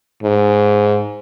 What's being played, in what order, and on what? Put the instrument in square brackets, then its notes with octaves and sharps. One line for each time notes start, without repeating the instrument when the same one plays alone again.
[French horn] G#2